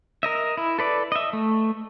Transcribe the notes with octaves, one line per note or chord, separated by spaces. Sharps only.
A#4 D#5 E5
E4
A4 B4 D5
D#5 E5
A3